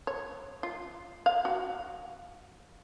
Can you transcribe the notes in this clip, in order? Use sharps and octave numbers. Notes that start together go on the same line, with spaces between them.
C#5
F4
F5
F#4